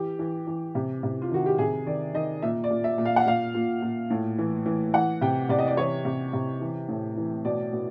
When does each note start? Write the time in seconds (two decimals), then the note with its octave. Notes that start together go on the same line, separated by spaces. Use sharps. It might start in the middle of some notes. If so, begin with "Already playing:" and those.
Already playing: E3 G4
0.19 E3
0.47 E3
0.75 C3
1.03 C3
1.22 F4
1.31 D#3 F#4
1.46 G4
1.58 C3 G#4
1.86 D#3 D5
2.14 D#3 D#5
2.42 A#2 E5
2.64 D5
2.70 A#2
2.84 E5
2.98 A#2
3.05 F5
3.16 F#5
3.26 A#2 F5
3.54 A#2
3.82 A#2
4.10 A2
4.38 E3
4.66 E3
4.94 E3 F#5
5.21 C3 G5
5.49 C3 D5
5.58 D#5
5.67 D5
5.77 E3 C#5
6.05 C3
6.33 C3
6.61 E3
6.89 A2
7.17 E3
7.45 B2 D5
7.73 B2